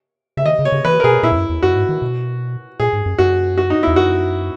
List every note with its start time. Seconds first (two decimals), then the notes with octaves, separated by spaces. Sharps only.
0.37 C#3 E5
0.45 D#3 D#5
0.59 C#3
0.65 C#5
0.72 C#3
0.85 E3 B4
1.00 A#4
1.04 B2 G#4
1.23 A#2 E4
1.32 E2
1.36 F#2
1.49 E2
1.63 F#2 F#4
1.75 G#2
1.89 D#3
2.02 B2
2.80 A#2 G#4
2.93 G#2
3.06 F#2
3.18 F#2 F#4
3.58 F#4
3.70 D#4
3.83 E2 E4
3.96 F#2 F#4